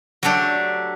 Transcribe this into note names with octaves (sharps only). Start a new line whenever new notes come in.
F#3 A3 D4 G4